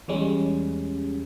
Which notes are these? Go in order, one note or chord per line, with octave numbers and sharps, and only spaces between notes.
E2 G3 G#3 C#4